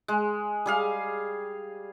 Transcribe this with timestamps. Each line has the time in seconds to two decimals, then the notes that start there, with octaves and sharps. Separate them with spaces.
0.08 G#3
0.66 G3 G#4 F5